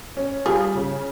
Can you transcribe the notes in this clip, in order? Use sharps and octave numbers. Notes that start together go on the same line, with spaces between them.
C#4
G3 F4 G#4
C#3